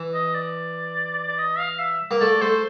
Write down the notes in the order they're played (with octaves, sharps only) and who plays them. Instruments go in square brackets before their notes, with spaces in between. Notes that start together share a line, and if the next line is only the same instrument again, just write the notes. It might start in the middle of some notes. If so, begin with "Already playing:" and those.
Already playing: [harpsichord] E3
[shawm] D#5
D5
D5
D#5
F5
E5
[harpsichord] A#3
[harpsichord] A3 [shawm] D5
[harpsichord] A3 [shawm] C5